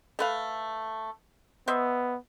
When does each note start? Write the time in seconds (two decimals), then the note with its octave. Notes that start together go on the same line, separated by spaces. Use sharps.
0.19 A3 B4 F5
1.68 B3 C5 D#5 E5